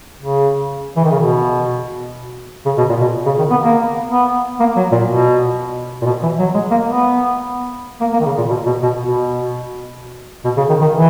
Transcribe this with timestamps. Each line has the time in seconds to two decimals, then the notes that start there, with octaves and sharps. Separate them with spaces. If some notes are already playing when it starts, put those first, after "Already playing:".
0.20 C#3
0.96 E3
1.05 D#3
1.11 C#3
1.19 B2
2.65 C#3
2.77 B2
2.89 A#2
3.01 B2
3.26 C#3
3.38 D#3
3.50 B3
3.62 A#3
4.11 B3
4.60 A#3
4.76 F#3
4.92 A#2
5.08 B2
6.02 A#2
6.05 B2
6.23 E3
6.39 F#3
6.54 G#3
6.71 A#3
6.88 B3
8.01 A#3
8.13 A#3
8.20 D#3
8.25 C#3
8.38 A#2
8.49 B2
8.66 B2
8.83 B2
8.99 B2
10.44 B2
10.57 C#3
10.69 D#3
10.81 D#3
10.94 E3